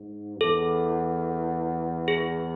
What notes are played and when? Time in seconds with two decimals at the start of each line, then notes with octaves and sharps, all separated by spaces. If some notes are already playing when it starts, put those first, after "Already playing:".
Already playing: G#2
0.41 E2 A4
2.08 G#4